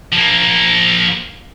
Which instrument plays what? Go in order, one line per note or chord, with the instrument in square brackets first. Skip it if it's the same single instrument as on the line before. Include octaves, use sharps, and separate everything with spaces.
[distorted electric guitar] F3 A#3